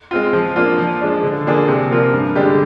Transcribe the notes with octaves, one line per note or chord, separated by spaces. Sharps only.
G#3 C4 F4
F3
A#3 D4 F4
F3
G#3 D4
D3
F3 A#3 D4 G#4
C3
F3 A#3 F4 A#4
G2
D3 G#3 D4 G4